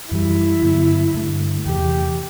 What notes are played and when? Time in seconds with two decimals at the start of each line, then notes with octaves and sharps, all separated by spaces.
0.11 F#2 E3 G3 E4
0.63 G2 D3 F#3 B3
1.15 G2 D3 A3
1.66 E2 C3 E3 G4